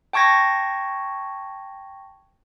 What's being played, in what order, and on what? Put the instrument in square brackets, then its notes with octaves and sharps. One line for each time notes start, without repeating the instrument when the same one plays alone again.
[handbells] G5 A5 C#6 G#6 A#6